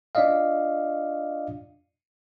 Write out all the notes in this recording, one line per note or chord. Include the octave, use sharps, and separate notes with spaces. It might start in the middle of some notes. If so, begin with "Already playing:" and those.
D4 F4 D5 D#5 F5